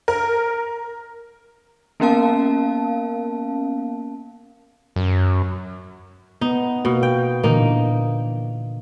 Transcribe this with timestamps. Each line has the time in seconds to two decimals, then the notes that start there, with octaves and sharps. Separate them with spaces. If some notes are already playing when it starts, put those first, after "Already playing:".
0.08 A#4
2.00 A#3 B3 C#4 A#4 F5 A5
4.96 F#2
6.41 B3 D#4
6.85 B2 A#3
7.03 G5
7.44 A#2 D3 E3 A#3 D#4